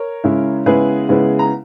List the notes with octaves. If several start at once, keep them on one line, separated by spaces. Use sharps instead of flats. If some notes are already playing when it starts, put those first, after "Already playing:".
Already playing: A#4 C#5
C#3 G#3 C#4 E4
C#3 G#3 B3 E4 G#4 B4
C#3 G#3 B3 E4
A#5